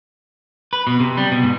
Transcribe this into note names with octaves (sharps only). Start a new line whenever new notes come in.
B4
B2
C3
G3
B2
G#2